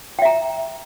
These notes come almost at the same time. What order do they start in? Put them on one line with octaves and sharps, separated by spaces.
G5 E5 A#5